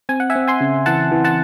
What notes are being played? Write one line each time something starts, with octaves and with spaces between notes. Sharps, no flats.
C4 G#5
F#5
E5 G#5
C4
G#5 C6
C#3
E3 F#5 A5
E3
F#5 A5